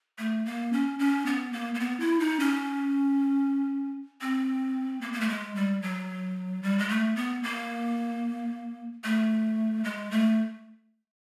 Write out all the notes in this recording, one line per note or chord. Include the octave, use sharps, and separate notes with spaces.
A3
A#3
C#4
C#4
B3
A#3
A#3
B3
E4
D#4
C#4
C4
A#3
A#3
A3
G#3
G3
F#3
G3
G#3
A3
B3
A#3
A3
G#3
A3